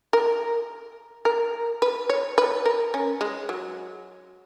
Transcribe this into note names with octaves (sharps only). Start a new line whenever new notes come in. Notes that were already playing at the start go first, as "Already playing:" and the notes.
A#4
A#4
B4
C#5
B4
A#4
C#4
G#3
F#3